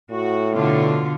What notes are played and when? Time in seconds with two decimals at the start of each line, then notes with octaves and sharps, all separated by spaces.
0.11 A2 F#4
0.53 B2 D3 F4